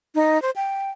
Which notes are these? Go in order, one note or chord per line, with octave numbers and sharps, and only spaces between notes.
D#4
C5
G5